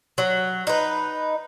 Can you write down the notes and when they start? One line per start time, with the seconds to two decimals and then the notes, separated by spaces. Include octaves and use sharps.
0.18 F#3
0.67 D#4 B4